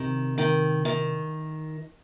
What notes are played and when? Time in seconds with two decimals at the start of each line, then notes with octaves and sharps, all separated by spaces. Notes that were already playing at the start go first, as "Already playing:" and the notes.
Already playing: C3 D#3
0.38 D#3
0.85 D#3